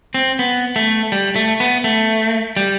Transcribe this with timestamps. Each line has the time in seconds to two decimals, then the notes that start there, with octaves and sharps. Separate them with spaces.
0.14 C4
0.39 B3
0.76 A3
1.12 G3
1.36 A3
1.60 B3
1.84 A3
2.57 G3